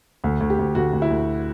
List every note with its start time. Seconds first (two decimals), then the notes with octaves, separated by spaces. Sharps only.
0.24 D2
0.40 D2
0.50 G4
0.59 D2
0.75 D2 F#4
0.93 D2
1.02 E4
1.10 D2